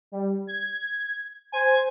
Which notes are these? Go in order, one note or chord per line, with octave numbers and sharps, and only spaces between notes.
G3
G#6
C5 G#5